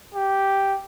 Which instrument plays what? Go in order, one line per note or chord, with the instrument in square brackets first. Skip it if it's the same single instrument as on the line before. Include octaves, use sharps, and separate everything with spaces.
[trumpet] G4